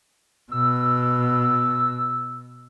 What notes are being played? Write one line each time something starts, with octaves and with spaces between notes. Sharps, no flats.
B2 E6